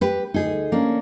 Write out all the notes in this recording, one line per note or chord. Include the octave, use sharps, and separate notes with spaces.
G4 B4
D2 D#4 G#4
A#3 C#4 D4